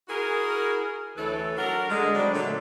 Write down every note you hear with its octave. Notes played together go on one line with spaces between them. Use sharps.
E4 F#4 G#4 A#4
D2 E3 E4 A4 B4 C#5
F#3 D4 F#4 A#4
D3 G#3
F#3 G3 C4 D4
A#2 D3 F#3 A3